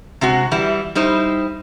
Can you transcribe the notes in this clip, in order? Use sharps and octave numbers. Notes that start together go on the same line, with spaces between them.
C3 G#3 F#4
E3 G3 E4
G3 D#4 E4 C5